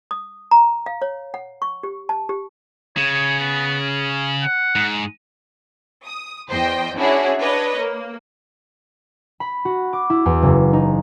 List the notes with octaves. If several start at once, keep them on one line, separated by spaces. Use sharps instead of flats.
D#6
A#5
F5
C#5
F#5
C#6
G4
A5
G4
C#3 C#5
B3
C#4
F#5
G#2
D#6
E2 C5 D#5 G5
C#4 D4 E4 F#4 G#4 C#5
D4 B4 C#5 D#5
A#3
B5
F#4
D6
E4
E2
F#1
D#4